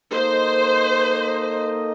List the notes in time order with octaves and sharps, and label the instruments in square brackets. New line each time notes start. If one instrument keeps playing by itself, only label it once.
[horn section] A#3 D#4 A4 D#5 [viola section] C5